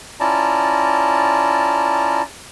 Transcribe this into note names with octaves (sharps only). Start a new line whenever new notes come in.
C#4 E4 F4 D5 A5 A#5